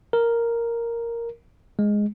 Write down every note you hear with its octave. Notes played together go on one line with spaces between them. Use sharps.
A#4
G#3